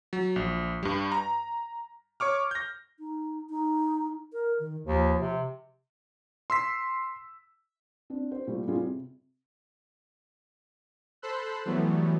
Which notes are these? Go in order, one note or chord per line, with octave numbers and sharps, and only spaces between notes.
F#3
A#1
G2 G3
A#5
C#5 C#6 D6 F6
G6 A#6
D#4
D#4
A#4
D#3
D#2 F3
C3
C6 E6 B6
C4 D4
C5
A#2 G3 A3
A2 G3 B3 F4 G#4
C3
A4 C5 B5 C6 E6 F#6
E3 F#3 G3 A3 B3